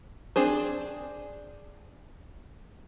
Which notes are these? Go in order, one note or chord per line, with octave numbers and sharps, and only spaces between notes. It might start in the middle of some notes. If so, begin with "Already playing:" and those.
C4 D4 G#4 C5